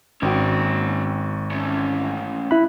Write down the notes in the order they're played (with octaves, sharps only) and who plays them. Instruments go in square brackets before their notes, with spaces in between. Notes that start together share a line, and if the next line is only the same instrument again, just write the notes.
[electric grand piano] G#1 F#4 [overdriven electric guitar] C#4 G5
[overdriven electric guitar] A3 C#4
[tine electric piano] E4 B5 [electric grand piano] F#6